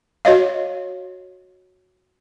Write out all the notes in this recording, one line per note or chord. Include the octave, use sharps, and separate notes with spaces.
F#4 C#5 D#5 F5